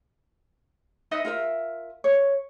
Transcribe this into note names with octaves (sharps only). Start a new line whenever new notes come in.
D#4 B4 D#5 E5
F4 A#4 E5
C#5